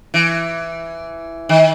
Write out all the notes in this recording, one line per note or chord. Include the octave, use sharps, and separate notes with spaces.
E3
D#3